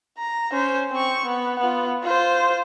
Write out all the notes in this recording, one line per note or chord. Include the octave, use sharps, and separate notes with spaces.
A#5
C#4 C5
C4 C#6
B3
B3 F4
F4 C5